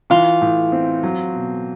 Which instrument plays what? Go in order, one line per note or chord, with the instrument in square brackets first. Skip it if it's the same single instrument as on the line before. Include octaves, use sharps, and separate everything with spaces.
[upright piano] E3 [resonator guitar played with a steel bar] F4
[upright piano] A2
C4
F#3
B2